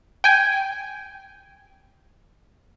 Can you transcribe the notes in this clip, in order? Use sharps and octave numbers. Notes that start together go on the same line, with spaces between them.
G5 G#5